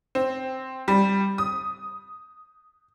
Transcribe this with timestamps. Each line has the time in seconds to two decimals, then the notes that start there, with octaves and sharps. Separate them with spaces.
0.15 C4
0.88 G3
1.38 D#6